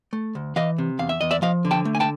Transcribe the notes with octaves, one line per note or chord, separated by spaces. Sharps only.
A3
D2
E3 D#5 F5
C3
E2 F5
E5
E2 D#5
D5 E5
F3 D#5 F5
D3
G5 A5
A3
G#5
G5 A5